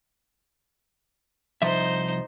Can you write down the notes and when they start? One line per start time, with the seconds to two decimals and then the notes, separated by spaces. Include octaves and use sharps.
1.62 C2 F3 D#4 C5 E5